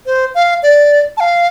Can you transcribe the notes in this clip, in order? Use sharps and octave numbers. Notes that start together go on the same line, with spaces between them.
C5
F5
D5
A5
F5